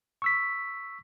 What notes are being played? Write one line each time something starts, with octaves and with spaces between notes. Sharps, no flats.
C#6 E6 B6